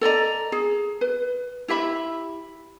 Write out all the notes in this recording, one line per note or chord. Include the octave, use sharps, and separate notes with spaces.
A4 D5 D#5 A#5
G#4
B4
E4 G4 E5 B5